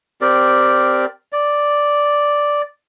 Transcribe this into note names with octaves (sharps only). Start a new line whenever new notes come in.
C4 G4 A#4 D5
D5